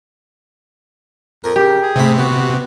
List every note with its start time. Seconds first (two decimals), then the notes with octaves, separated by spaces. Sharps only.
1.44 F2 A#4
1.56 C#3 G4
1.82 G#4
1.96 G#2 C3 A3 B5
2.18 B3 F#4